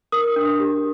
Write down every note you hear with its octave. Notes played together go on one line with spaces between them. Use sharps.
A#4 D#6
D4
G4